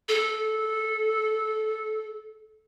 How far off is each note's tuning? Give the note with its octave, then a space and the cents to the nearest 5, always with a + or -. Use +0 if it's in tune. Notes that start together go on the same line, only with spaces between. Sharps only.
A4 -15